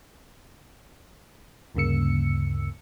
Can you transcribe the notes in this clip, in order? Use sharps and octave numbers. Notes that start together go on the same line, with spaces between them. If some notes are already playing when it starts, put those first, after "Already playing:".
D2 G2 C#3 A#3 E6 C#7